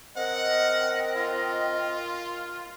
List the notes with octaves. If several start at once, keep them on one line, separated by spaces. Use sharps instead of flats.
C4 A#4 D#5 F#5
F4